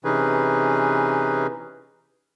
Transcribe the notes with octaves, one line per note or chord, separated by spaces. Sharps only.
C3 E3 C#4 D#4 G#4 B4